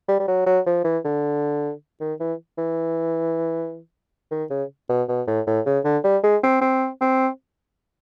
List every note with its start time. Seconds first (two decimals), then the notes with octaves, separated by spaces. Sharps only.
0.08 G3
0.19 G3
0.28 F#3
0.46 F#3
0.66 F3
0.84 E3
1.05 D3
2.00 D#3
2.20 E3
2.58 E3
4.31 D#3
4.50 C#3
4.89 B2
5.08 B2
5.27 A2
5.47 A2
5.66 C#3
5.84 D3
6.04 G3
6.23 G#3
6.43 C4
6.61 C4
7.01 C4